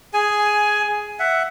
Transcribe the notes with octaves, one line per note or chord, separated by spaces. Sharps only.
G#4 G#5
E5 F#5